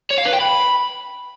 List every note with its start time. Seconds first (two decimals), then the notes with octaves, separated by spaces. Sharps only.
0.11 C#5
0.18 F5
0.26 B4
0.33 G5
0.40 B5